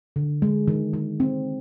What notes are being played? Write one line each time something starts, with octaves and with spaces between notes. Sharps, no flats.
D3
G#3
D#3
D#3
C4